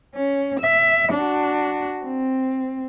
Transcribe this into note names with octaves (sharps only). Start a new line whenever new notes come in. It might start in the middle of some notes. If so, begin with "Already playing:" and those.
C#4
E5
D4 F#4
C4